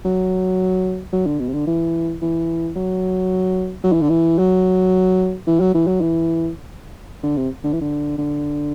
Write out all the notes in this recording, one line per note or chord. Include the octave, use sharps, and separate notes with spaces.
F#3
F#3
D3
B2
C3
D3
E3
E3
F#3
F#3
E3
D3
E3
F#3
E3
F#3
E3
F#3
E3
D3
C3
D3
E3
D3
D3